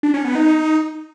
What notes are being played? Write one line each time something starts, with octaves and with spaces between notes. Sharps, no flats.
D4
C#4
B3
D#4